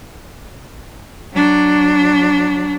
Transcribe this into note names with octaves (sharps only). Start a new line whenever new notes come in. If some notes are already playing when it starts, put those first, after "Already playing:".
F#3 D4